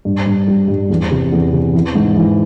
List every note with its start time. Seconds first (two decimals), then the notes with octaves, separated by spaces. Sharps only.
0.05 G2
0.26 G2
0.47 G3
0.68 G2
0.90 E2
1.11 C3
1.32 E2
1.53 C3
1.74 E3
1.95 G#2
2.16 E3